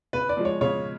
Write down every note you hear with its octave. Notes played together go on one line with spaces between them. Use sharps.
C#3 B4
D5
F3 G#3
C#5
C#3 C#5